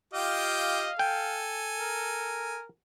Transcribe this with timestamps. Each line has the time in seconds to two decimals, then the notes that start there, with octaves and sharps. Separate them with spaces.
0.14 F4 G4 D#5 F5 G5
0.99 A4 G5 G#5
1.80 A#4